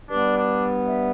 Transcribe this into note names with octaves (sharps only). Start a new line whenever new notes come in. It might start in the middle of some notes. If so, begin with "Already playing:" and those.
G2 G3 B3 D4
D4
E5